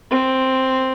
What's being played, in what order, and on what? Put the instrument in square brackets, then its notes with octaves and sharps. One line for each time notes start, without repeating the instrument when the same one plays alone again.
[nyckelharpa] C4